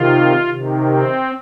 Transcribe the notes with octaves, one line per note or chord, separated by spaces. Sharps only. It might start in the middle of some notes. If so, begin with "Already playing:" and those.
Already playing: C3 D#3 F4
C3 D#3
C4